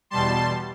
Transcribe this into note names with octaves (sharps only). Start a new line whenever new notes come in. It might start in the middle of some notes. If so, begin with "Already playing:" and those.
E2 B2 G3 A5 C6